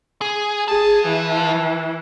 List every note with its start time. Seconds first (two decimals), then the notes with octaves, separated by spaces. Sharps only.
0.21 G#4
0.68 F3 G#4 A5
1.07 E3